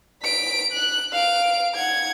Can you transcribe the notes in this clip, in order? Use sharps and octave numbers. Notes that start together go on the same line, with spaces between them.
B6 D7
F#6
F5 D7
F#5 G#6